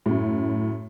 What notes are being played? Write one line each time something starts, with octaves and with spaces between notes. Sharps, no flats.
F#2 A2